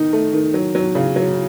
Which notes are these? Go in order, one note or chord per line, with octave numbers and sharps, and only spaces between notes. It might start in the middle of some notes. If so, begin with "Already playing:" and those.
Already playing: D#3 D#4
A3
D#3
F#3
F#3
C#3
F#3